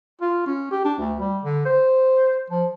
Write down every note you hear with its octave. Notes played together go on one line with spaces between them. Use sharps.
F4
C#4
G4
D4
D2
G3
D3
C5
F3